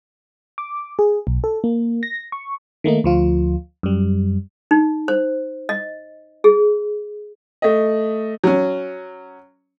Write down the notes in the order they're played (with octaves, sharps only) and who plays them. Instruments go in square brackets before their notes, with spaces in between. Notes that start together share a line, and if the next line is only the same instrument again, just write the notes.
[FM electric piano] D6
G#4
B1
A4
A#3
A#6
C#6
D#3 A3 A#3 D#4
D2 F3 F4
F#2 G3
[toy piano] D#4
C5
D#5
G#4
[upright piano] A3 D#5
[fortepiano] F#3 C#4